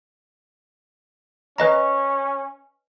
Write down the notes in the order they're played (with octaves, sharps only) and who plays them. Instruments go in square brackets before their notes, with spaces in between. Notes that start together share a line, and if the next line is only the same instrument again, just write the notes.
[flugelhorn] C#4 [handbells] B4 D#5 A#5